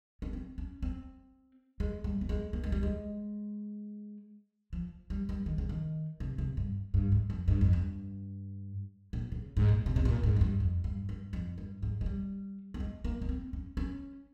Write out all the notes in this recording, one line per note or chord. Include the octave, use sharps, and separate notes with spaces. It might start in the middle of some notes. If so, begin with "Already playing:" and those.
C#4
C4
C#4
C4
G#3
G3
A#3
G#3
A#3
G#3
G3
G#3
F3
G3
G3
D#3
C#3
D#3
C3
C3
G2
G2
G#2
F2
G2
F2
G2
A#2
C#3
G#2
A#2
C3
C3
A#2
G#2
F2
G2
F2
G2
G2
F2
G2
G#2
G#3
G3
A#3
G#3
A#3
A#3
C4
C#4
C#4